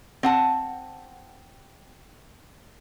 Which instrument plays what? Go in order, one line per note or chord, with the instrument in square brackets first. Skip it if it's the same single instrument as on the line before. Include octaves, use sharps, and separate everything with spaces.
[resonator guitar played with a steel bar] C4 F#5 A5